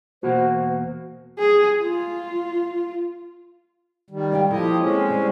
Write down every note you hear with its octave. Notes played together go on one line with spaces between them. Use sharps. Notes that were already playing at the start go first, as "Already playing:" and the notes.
E2 B2 A#3 F#4 C5
G#4
F4
D#3 G3
G4 F5 G5
F3 A#3 E4 G4 A4 D#5
G#3 C4 C#4
G3